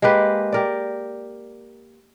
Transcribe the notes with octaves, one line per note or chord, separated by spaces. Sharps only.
G#3 A#3 G4 B4
G4 A#4 D5